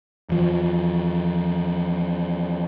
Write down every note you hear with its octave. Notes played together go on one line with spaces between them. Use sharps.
E2 F3